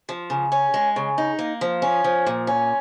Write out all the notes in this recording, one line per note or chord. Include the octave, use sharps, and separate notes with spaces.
F3
C#3
C#4
G#3
C#3
D#4
A#3
F3
C#4
F3
A#2
C#4